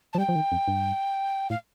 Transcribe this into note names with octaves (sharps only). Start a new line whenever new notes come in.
F3 A5
G3 G5
F3
D#3
F2
G2
A2 F5